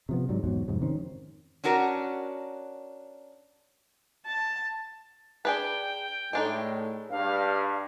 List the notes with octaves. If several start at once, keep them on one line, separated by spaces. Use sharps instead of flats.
C3 F3 B3
G#2 F#3 G3
E2 G#2 B2 F#3
F2 G#2 C3
D#3 C4 C#4
C#4 D4 F#4 A#4
A5
D4 G#4 B4 G5
A2 G#3 D4 D#4
G2 F5